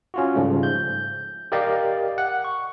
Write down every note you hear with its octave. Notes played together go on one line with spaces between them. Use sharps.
C#4 F4 F#4
G#2 C#3 F3 G3 A3
G6
G4 A#4 D5 D#5 F5 G5
F#5
C#6